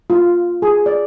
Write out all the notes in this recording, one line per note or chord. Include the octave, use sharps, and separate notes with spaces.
F4
G#4
D5